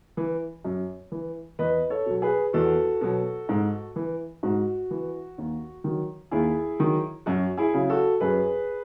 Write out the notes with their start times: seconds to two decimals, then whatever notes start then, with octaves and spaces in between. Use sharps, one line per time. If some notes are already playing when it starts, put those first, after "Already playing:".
0.17 E3
0.65 F#2
1.12 E3
1.59 E2 B4 D#5
1.90 A4 C#5
2.06 B2 F#3
2.22 G#4 B4
2.53 E2 F#4 A4
3.01 B2 F#3
3.49 G#2
3.96 E3
4.43 G#2 F#4
4.91 E3
5.38 D#2
5.84 D#3 F#3
6.31 D#2 E4 G#4
6.80 D#3 F#3
7.26 F#2 F#4
7.58 E4 G#4
7.74 C#3 F#3
7.90 F#4 A4
8.21 F#2 G#4 B4